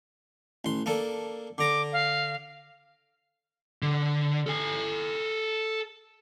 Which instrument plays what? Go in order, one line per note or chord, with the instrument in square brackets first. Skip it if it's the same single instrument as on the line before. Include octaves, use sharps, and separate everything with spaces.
[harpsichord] A1 C6
A#3 D4 A4
[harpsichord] D3 A#5 [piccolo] D6
[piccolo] F5
[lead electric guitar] D3
A4 G#5